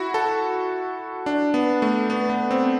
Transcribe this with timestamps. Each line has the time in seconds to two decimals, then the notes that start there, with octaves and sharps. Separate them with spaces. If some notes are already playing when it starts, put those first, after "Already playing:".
Already playing: E4 F#4
0.14 A4
1.26 D4
1.54 B3
1.82 A3
2.10 B3
2.30 B3
2.51 C4